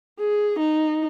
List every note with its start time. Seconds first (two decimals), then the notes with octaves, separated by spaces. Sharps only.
0.20 G#4
0.60 D#4